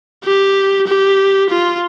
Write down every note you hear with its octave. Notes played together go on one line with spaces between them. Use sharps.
G4
G4
F4